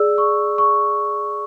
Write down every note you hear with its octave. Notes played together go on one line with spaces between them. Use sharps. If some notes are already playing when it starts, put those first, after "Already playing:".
Already playing: G#4 D5 E6
C#6
C#6